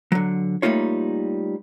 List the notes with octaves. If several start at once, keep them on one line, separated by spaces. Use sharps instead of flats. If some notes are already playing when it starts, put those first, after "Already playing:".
D3 F#3
G3 A3 A#3 D#4 F4 C#5